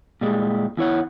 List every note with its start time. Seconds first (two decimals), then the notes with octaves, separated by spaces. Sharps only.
0.21 A#2 G3 G#3
0.77 E2 E4 C#5 F#5